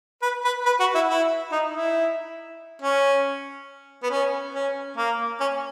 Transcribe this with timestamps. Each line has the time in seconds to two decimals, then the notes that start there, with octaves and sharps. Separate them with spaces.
0.22 B4
0.45 B4
0.66 B4
0.80 F#4
0.95 E4
1.09 E4
1.52 D#4
1.74 E4
2.82 C#4
4.03 B3
4.11 C#4
4.54 C#4
4.97 A#3
5.40 C#4